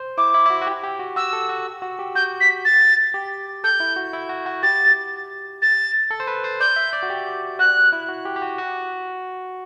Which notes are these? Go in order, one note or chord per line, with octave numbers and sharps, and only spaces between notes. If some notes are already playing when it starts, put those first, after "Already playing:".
Already playing: C5
E4 D6
E4
E4
F#4
F#4
G4
G4
F#4
F#4 E6
A4
F#4
F#4
G4
F#4 G6
B6
A6
G4
A4 G6
E4
F#4
E4
F#4
F#4
G4 A6
A6
A4
C5
B4
C5
D5 G6
E5
D5
F#4
G4
F#4 F#6
E4
F#4
G4
G4
F#4
F#4